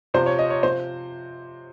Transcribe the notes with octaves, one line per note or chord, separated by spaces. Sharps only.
C3 F3 C5
C#5
D#5
C#5
C3 F3 C5